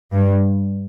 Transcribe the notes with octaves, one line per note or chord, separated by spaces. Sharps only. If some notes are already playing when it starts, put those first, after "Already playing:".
G2